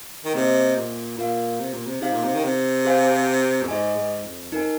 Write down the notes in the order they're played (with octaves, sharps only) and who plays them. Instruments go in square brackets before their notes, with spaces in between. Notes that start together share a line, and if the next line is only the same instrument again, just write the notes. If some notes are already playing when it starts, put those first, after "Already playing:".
[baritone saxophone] D#3
[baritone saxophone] C3 [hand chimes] A#3 G#4 C5 D#5
[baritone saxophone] A#2
[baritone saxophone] A#2 [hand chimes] F4 A#4 F5
[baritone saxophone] C3
A#2
C3
[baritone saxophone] C3 [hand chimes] D#4 G#4 F5
[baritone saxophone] A#2
C3
D#3
C3
[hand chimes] G#4 C5 F5 G#5
[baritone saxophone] F2
[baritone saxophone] G#2 [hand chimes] G#4 D#5 G#5
[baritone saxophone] G#2
F2
[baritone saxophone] F2 [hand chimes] D#4 A#4 G#5